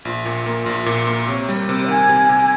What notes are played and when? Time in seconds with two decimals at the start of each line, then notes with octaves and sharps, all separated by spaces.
0.05 A#1 F4
0.25 A#2
0.46 A#3
0.66 A#1
0.86 A#2
1.07 A#3
1.28 C3 C#5
1.49 G3
1.54 A#4
1.58 C5
1.69 C3
1.88 D#3 G#5
2.09 C3
2.29 C3